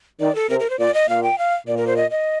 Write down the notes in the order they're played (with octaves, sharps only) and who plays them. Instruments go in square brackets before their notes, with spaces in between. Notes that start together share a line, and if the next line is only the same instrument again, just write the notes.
[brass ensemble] D#3 [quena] D5
[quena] A4
[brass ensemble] C3 [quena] A#4
[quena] A#4
C5
[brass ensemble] A#2 [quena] D5
[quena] D#5
[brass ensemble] A#2 [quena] F5
[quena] G5
F5
[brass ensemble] A#2 [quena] D5
[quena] A#4
C5
D#5
D#5